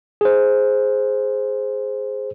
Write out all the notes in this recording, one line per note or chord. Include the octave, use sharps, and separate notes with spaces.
G#4 C5